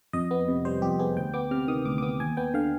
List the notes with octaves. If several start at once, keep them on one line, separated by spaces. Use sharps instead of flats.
F2 D#5
B3
C3
G3 C5
F2 G4
B3 G#4
D2 G5
B3 D6
C3 F6
D#3 D#6
D2 D6
D6
B3 D#6
D#2 G#5
B3 G5
D3 F5